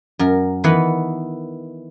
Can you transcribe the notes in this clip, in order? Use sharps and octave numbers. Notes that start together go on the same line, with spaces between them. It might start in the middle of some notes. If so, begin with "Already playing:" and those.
F#2 A#4
D#3 E3 B3 B4 F#5 A#5